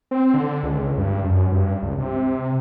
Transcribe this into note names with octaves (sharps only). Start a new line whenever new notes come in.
C4
D3
C#2
G2
F#2
G2
C#2
C3